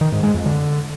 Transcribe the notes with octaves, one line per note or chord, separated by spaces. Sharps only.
D#3
G#2
G#3
F2
D3